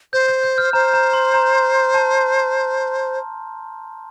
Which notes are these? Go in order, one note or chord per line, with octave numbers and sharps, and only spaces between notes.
C5 G6
G6
G6
F6
C5 A#5
A#5
C6
A#5
A5